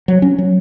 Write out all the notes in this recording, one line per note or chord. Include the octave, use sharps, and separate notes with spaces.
F#3
C#4
F#3